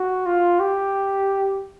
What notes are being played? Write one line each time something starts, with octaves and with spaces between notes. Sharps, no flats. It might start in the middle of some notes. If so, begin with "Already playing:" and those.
Already playing: F#4
F4
G4